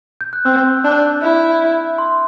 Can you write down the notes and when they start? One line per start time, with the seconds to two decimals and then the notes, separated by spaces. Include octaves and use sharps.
0.21 G6
0.33 F#6
0.45 C4 E6
0.84 D4
1.22 E4
1.98 C6